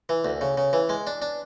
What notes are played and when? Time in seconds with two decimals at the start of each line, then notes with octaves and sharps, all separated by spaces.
0.09 E3
0.25 D2
0.41 C#3
0.57 C#3
0.73 E3
0.89 G#3
1.07 D4
1.22 D4